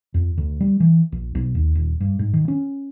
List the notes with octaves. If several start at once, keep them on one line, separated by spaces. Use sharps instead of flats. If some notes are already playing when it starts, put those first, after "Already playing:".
F2
D2
G3
E3
A#1
B1
D#2
D#1
G2
G#2
D#3
C#4